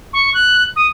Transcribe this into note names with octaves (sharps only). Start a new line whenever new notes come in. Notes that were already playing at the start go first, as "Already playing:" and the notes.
C#6
F#6
D#6